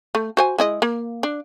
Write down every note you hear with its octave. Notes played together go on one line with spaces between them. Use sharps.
A3
F#4 C5 G#5
G#3 E4 D#5
A#3
D4